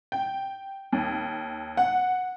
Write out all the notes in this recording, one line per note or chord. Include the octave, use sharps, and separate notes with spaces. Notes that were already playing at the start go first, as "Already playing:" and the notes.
G5
D#2
F#5